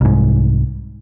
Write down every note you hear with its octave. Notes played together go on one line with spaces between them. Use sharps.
C2 G#2